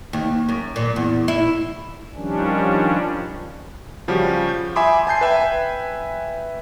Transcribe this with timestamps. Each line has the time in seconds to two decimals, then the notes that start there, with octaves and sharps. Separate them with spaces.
0.13 D#2
0.49 F#2
0.76 A#2
0.96 E2
1.28 E4
2.15 D#3 F3 G3 C#4 D4
4.08 C#3 F3 G3 C#4 F#4 G4
4.48 G6
4.76 E5 G#5 B5 C6 D6 D#6
5.07 G#5 A5 G6 C7
5.21 B4 E5 G5 G#5